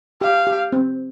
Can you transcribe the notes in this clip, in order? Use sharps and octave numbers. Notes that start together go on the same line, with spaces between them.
G4 F5
G4
C4